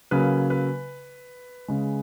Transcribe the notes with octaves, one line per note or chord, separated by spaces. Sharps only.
C#3 F#3 A#3 B4
B4
C#3 G#3